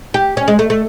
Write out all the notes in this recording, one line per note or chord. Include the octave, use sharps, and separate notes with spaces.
G4
C#4
G#3
A3
A3